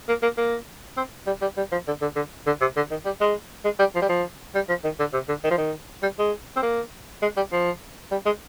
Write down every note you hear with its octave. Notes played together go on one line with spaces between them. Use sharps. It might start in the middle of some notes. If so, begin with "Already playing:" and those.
A#3
A#3
A#3
C4
G3
G3
G3
F3
D3
D3
D3
D3
C3
D3
D#3
G3
G#3
G#3
G3
F3
G3
F3
G3
F3
D#3
D3
C3
D3
D#3
F3
D#3
G3
G#3
C4
A#3
G#3
G3
F3
G3
G#3